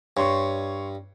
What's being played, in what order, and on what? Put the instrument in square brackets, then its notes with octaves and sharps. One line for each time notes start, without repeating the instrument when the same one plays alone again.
[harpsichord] G2 [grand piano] C#5 C6 C#6